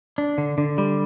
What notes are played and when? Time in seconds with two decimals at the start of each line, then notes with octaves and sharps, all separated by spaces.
0.18 D4
0.38 D3
0.58 D3
0.78 G3